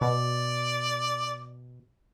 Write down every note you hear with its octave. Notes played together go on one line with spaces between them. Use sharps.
B2 D5